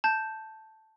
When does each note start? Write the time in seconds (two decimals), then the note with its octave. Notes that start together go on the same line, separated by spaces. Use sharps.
0.04 A5 G6